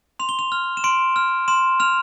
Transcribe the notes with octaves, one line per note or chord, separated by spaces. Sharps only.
C6 F7
G7
F7
F6
E7
C6 D7
F6
C6 E7
F6 F7